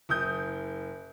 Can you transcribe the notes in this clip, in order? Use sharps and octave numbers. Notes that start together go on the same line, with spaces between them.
F#1 D#6 G6